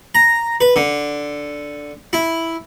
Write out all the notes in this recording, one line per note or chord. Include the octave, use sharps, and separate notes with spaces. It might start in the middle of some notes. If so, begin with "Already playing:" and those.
A#5
B4
D3
E4